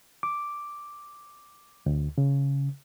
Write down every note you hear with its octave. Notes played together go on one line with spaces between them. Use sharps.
D6
D2
C#3